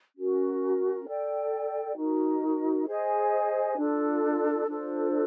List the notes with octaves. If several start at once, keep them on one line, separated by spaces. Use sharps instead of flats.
C#4 F#4 A#4
A4 D5 G5
D#4 F#4 A#4
G#4 C5 D#5 G#5
D4 F4 A4
D4 F4 A4 C5